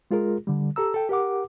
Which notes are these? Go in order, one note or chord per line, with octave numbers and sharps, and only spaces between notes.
G#3 F4 G#4 A#4
D3 G3
G4 A4 A#5 E6
A4 G5
G4 A#4 F#5 D6